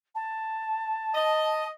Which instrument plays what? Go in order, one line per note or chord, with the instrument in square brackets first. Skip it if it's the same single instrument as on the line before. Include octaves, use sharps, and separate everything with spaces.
[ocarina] A5
[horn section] D#5